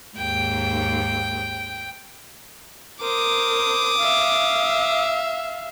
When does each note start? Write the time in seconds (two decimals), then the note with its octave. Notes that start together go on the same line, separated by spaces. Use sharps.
0.17 D#2 G#2 G5
3.01 A#4 C5 D6 D#6
3.98 E5 F5